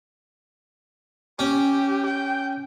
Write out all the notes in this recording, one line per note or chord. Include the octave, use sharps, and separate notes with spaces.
C#4 G4
G5